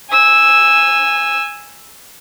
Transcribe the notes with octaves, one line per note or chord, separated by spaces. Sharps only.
G#5 E6